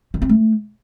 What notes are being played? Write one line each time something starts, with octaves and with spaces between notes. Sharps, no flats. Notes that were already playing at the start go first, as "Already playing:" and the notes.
D#3
C4
A3